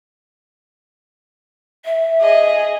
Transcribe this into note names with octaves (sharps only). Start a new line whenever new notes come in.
E5
G#4 D#5